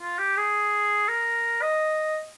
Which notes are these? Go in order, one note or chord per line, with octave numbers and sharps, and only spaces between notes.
F4
G4
G#4
A#4
D#5